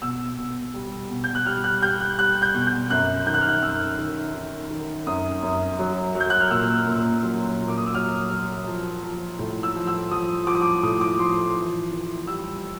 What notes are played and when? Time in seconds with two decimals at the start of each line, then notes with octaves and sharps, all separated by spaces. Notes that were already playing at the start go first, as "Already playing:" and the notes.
0.02 B2 E6
0.38 B2
0.74 G3
1.10 B2
1.24 G6
1.35 F#6
1.46 G3 F6
1.64 F#6
1.82 G3 G6
2.00 F#6
2.19 G3 F#6
2.42 G6
2.54 B2
2.67 G6
2.90 F#2 F#6
3.27 D#3 G6
3.34 F#6
3.41 F6
3.48 F#6
3.63 F#2 E6
3.99 D#3
4.34 D#3
4.71 D#3
5.06 F#2 D#6
5.43 F#2
5.79 F#3
6.15 F#3
6.20 G6
6.30 F#6
6.41 F6
6.51 A#2 E6
6.87 A#2
7.23 F#3
7.59 A#2
7.68 D6
7.77 D#6
7.86 E6
7.95 F#3 F6
8.31 F#3
8.67 F3
9.03 F3
9.39 A2
9.63 E6
9.75 F3
9.87 E6
10.11 F3 D#6
10.47 F3 D6
10.55 D#6
10.62 D6
10.83 A2 D#6
11.01 D6
11.19 F3 C6
11.56 E3
11.91 E3
12.27 G3 E6